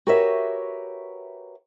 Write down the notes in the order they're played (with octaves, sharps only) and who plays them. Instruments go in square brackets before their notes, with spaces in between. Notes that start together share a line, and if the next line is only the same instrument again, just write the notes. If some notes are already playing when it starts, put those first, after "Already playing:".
[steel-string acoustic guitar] F#4 G4 A#4 B4 C#5 E5